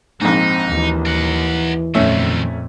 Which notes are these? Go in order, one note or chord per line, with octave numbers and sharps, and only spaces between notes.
A#1 G#2 C4 D#4
D#2 E3
A#4 F#5
F2 A#2 D#3 F#3 A3 C#4